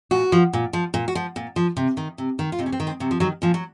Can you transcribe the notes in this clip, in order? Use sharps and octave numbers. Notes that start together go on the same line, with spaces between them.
A#2 F#4
F3
A#2
F3
A#2
F#4
F3
A#2
F3
C3
D#3
C3
D#3
F4
C3 D#4
C#4
C4
D#3
C4
C3 F#3
F3
D#3 F#3
A#2 F3
F#3